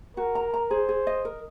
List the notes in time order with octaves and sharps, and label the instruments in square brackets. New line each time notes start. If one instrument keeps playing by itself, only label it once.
[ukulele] F#4 [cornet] A#4
[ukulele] A#5
A#5
[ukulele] G#4 [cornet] C5
[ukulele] G#4
D#5
A#4